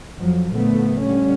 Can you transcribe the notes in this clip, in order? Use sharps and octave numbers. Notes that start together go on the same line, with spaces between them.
F2 F3 F#3
A#2 D3 F3 A3 B3
D3 G3 C#4